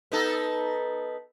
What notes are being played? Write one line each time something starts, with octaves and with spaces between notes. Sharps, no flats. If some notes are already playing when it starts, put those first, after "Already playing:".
B3 D#4 A4